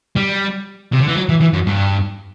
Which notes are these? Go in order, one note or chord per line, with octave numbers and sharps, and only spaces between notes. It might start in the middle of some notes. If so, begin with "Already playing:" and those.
G3
C3
D3
E3
F#3
E3
E3
F#2
G2